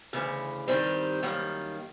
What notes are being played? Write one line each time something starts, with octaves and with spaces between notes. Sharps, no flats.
D2 C#3 E3
G2 D#3 G3 C4
F#2 D#3 G3 A#3